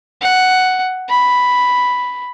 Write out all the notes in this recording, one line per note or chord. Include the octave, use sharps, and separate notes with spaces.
F#5
B5